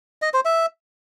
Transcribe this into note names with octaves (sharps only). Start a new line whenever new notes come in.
D#5
C5
E5